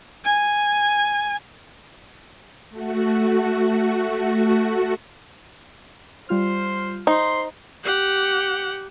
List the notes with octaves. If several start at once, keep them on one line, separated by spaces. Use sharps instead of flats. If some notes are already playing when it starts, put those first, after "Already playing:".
G#5
A3 F#4
G3 F4 C5 F6
D#4 C5 C6
G4 F#5